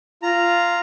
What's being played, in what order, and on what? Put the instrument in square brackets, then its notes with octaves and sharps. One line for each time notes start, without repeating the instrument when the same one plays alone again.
[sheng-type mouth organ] F4 A#5